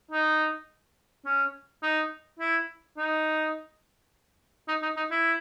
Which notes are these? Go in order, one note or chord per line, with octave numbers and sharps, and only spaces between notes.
D#4
C#4
D#4
E4
D#4
D#4
D#4
D#4
E4